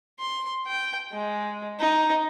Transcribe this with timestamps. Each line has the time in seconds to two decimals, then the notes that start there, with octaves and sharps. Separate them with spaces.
0.19 C6
0.67 G5
1.12 G#3
1.79 D#4